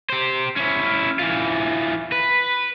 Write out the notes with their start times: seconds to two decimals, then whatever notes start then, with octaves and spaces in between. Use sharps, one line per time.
0.10 G4 C5
0.57 C#4 E4
1.19 E3 F4
2.12 B4